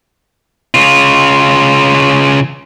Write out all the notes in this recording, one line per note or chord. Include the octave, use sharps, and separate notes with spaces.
C#3 F4